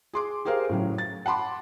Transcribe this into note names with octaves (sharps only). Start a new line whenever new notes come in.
G#4 C6 D6
G4 G#4 A#4 C5 F5
A2 C#3 F#3
A6
F#5 A5 B5 C6 D6